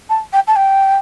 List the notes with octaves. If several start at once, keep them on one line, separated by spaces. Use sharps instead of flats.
A5
G5
A5
G5